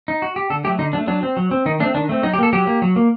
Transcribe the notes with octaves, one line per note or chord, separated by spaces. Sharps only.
D#4
F#4
G4
D3 A4
F#3 A3 G4
D3 D#4
F#3 D4
A3
F#3 D4
C4
F#3
C4
D#3 D#4
A3 C4 D4
D#3 D4
A3 C4
F#3 D#4
G4
A#3 A4
F#3 G4
A#3
F#3
A#3